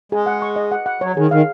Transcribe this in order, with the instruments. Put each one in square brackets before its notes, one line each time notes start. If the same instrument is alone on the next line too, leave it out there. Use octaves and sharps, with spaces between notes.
[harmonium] G#3 [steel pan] G#4
[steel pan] F#5
C#6
D#5
F#5
F#5
[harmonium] F#3 [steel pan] C#5
[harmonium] D#3 [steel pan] G#4
[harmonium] D#3 [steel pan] F5